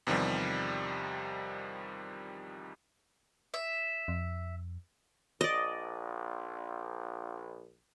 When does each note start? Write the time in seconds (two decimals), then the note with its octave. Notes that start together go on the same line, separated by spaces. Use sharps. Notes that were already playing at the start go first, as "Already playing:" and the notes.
0.07 E2 C3 D#3 F3 G3
3.54 E5
4.08 F2
5.41 A#1 D5 D#5